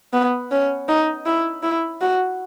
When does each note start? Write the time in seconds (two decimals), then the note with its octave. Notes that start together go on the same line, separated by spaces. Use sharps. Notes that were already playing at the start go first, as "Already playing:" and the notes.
0.13 B3
0.51 C#4
0.88 D#4
1.26 E4
1.63 E4
2.01 F#4